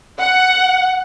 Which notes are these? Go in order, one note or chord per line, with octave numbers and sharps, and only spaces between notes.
F#5